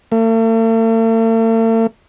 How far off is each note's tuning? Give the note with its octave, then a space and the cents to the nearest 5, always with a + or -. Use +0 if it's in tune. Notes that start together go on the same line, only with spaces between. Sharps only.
A3 +45